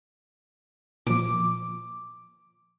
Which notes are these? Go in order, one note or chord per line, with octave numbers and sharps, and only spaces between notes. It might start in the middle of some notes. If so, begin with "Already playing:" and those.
A#2 F3 D6